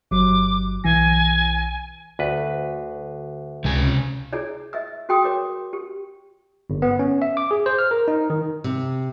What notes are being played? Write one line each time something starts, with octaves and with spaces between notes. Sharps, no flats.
G1 F#3 D6
B1 E3 G#5 A#6
D2 B4
C#2 C3 G#5
E4 G#4 C#5 D5
D#5 E5 E6
F#4 G#4 G5 C6 D#6 E6
A#4 C#5 D6
G4
G1
B3
C#4
E5
D6
G#4
C5
F6
A#4
D#4
D#3
C3